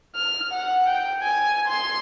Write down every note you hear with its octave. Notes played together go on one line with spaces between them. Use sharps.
F6
F#5
G5
G#5
C6